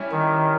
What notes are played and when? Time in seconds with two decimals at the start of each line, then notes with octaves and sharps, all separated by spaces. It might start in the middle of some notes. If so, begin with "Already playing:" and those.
Already playing: G3 C#4 E4
0.11 D#3